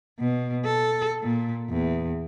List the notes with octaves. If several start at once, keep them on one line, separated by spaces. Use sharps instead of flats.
B2
A4
A#2
E2